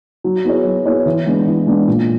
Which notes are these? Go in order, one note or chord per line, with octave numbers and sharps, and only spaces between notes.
F#3
B3 E4 G#4 C#5
F#3
B3 E4 G#4 C#5
E3
G#3 B3 D4
E3
G#3 B3 D4
A#2